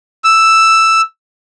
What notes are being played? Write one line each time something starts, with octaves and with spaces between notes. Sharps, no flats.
E6